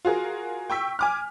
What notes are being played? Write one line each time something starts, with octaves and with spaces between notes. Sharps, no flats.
F4 F#4 G#4 A#4
G5 C#6 E6 B6
G#5 D6 F6